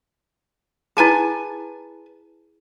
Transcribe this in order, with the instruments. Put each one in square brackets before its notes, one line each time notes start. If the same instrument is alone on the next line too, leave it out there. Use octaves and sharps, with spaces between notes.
[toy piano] E4 G#4 [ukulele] B4 G#5 A5